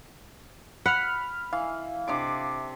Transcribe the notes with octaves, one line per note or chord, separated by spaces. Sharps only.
F#5 B5 F6
E3 F5
C3 D4 D6